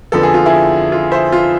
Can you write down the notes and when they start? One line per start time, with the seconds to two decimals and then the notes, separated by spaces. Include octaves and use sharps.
0.12 F2 D3 F3 B3 A4
0.23 G#4
0.34 F4
0.46 E4 G#4
0.92 F4
1.11 C5 E5
1.32 F4